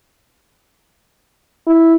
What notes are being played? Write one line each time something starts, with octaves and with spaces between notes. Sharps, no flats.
E4